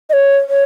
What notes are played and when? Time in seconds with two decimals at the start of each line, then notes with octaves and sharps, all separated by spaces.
0.10 D#5
0.13 C#5
0.49 C#5